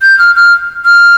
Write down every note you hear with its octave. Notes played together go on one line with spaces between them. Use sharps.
G6
F6
F6
F6